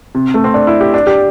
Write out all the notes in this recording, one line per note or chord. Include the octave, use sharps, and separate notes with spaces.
C3
A3
C4
D4
E4
G4
D4
G4